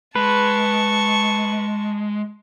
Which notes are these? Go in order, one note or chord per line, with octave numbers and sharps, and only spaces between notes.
G#3 B4 A5 C#6